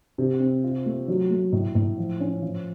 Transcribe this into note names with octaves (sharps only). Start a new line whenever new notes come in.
C3
C4
F4
A3
F#3
A3
A2
A2
F3
C#4
F3